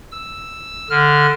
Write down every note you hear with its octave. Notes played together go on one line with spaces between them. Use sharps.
E6
D3 F6